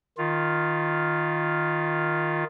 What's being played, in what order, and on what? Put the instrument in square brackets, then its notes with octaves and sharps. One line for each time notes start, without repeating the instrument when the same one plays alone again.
[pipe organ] D#3 F4